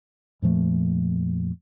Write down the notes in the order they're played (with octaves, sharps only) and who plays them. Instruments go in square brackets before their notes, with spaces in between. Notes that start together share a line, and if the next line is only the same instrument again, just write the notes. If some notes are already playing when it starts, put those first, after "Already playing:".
[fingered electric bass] F2 A#2 F3 A3